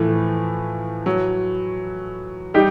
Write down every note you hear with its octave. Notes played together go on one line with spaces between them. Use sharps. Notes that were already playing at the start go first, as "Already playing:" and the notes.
Already playing: A2 E3 F3 A3
F#3
G3 D#4 G4